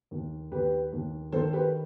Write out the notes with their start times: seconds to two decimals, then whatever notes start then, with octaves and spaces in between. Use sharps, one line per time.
0.11 D#2
0.51 D#2 G4 B4
0.92 D#2
1.32 D#3 A4 C5
1.53 G4 B4